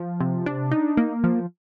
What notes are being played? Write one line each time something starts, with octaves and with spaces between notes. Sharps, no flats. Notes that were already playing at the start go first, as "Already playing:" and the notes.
Already playing: F3
C3
D4
D#4
A#3
F3